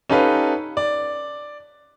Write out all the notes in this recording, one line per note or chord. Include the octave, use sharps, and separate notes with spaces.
C#4 D#4 G4 A4 B4 F5
D5